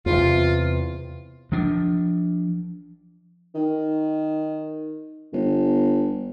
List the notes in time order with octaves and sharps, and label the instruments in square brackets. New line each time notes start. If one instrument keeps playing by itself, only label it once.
[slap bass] E2 C3 [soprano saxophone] F4
[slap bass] F3 D4
[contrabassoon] D#3
G1